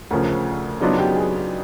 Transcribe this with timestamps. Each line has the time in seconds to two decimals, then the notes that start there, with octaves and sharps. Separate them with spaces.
0.11 D2 C#3 F3 A#4
0.80 C#3 F#3 B3 D4 D#4 F4 D#5
0.98 G4 G5
1.16 G#4 G#5